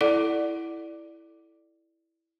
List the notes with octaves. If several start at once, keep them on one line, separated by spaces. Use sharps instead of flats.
E4 A4 D5 F#5 D6